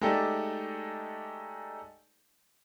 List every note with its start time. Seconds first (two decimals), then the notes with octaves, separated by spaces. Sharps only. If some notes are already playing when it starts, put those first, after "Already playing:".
0.01 G#3 A3 D#4 G4 A4 D5